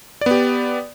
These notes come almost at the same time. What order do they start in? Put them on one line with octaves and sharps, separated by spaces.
D5 B3 G4